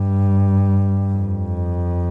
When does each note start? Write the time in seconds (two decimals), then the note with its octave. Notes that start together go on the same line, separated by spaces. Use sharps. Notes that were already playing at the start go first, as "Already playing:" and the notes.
Already playing: G2
1.14 F2